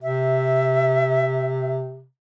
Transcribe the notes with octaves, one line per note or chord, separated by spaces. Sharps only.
C3 E5